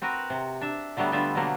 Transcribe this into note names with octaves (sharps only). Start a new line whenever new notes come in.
C4 F#4 A#4 B4
C3
D4 E5
D3 F#3 G3 A3 B3
D3 G3 A3 F4 E5
B2 D3 F#3 A#3